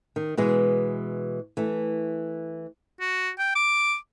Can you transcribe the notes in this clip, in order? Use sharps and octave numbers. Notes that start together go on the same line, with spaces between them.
D#3
B2 E3 G#3
E3 A3
F#4
G5
D6